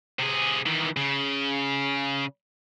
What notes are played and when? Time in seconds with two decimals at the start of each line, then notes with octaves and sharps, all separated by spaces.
0.19 C3 G#4
0.66 D#3 E3
0.97 C#3